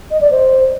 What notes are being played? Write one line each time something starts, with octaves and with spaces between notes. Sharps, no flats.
D#5
D5
C5